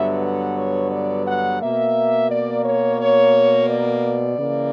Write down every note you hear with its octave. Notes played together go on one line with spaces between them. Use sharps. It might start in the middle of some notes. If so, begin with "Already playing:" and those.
Already playing: G2 D3 F#3 B3 E5
F#5
C#5
D5
F#5
B2 A#3 E5
D5
C#5
C#5
D5
C#3 E3 A#3